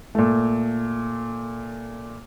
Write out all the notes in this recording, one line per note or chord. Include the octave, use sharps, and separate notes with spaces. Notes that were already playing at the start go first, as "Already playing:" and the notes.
A#2 A3